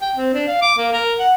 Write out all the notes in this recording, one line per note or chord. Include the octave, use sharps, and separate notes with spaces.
G5
C4
D4
F5
D6
A#3
A#4
F#5